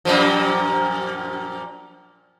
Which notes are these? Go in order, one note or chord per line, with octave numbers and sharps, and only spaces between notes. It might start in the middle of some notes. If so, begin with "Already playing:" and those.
F#2 A#2 F3